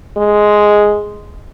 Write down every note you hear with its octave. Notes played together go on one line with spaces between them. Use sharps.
G#3